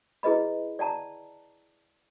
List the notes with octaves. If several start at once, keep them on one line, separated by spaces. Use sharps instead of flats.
E4 G#4 B4 D#5 B5
D5 G5 A5 A#5